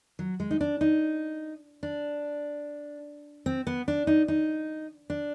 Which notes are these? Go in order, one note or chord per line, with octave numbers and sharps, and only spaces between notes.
F#3
G#3
D#4
D4
D#4
D4
C4
B3
D4
D#4
D#4
D4